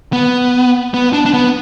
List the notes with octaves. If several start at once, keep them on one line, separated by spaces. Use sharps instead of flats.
B3
B3
D4
D4
B3